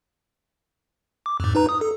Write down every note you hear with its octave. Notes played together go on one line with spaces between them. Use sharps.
D6
F2 G#2
D#4 B4 A#5
D#6
A4